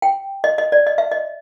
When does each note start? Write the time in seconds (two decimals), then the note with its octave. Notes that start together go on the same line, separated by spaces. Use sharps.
0.02 G5
0.44 D#5
0.58 D#5
0.72 D5
0.86 D#5
0.98 E5
1.12 D#5